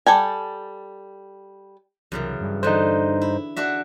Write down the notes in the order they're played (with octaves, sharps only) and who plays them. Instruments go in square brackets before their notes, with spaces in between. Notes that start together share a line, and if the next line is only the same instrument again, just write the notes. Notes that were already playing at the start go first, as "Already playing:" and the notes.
[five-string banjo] G3 A4 G5 G#5
[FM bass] C2 [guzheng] F#2 C#3 E3
[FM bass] G2
[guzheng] D3 E3 [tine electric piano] D#4 C5
[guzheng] E4
D4 F#4 E5